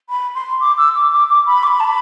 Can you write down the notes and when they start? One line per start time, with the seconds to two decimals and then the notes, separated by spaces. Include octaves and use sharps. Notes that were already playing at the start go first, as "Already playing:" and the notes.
0.08 B5
0.34 C6
0.60 D6
0.77 E6
0.94 D6
1.11 D6
1.28 D6
1.45 B5
1.62 D6
1.66 B5
1.79 A5
1.83 B5